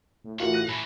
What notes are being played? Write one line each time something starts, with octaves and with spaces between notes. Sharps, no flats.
A2
E3 F4 F#4 A#4 F#5
F#6 A#6 D#7
A2 E3 B5